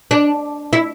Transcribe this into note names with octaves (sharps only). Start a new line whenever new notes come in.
D4
E4